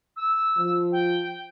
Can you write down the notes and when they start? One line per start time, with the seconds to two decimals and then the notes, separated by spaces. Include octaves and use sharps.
0.16 E6
0.58 F3
0.92 G5